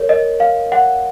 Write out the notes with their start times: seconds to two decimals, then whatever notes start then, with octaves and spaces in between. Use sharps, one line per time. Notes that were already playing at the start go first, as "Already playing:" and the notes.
Already playing: A#4 C#5
0.09 D#5
0.40 F5
0.72 F#5